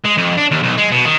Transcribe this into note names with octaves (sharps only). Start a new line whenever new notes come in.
G#3
F2
D4
D#2
B1
G#3
B2
D#3